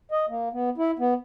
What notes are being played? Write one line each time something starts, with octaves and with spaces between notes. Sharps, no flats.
D#5
A#3
B3
E4
B3